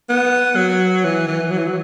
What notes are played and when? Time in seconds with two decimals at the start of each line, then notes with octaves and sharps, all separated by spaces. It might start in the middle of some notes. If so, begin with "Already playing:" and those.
0.09 B3
0.56 F#3
1.04 E3
1.27 E3
1.51 F#3
1.58 E3
1.66 F#3